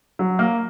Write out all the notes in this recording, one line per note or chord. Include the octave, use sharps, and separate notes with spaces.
F#3
A#3